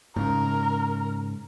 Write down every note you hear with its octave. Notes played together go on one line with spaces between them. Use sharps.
G#2 C#3 A#4